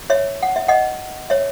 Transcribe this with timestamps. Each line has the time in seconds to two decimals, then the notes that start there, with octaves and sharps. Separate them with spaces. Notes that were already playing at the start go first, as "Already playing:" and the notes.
0.10 C#5 E5
0.43 F#5
0.56 E5
0.68 D#5 F#5
1.30 C#5 E5